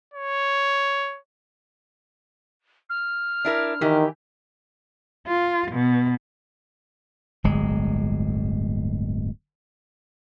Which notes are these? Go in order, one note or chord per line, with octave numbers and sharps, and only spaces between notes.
C#5
F6
D4 E4 A#4
D#3 E3 G4
F4
B2
D1 G1 G#3